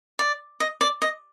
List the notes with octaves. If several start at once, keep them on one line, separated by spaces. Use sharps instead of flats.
D5
D#5
D5
D#5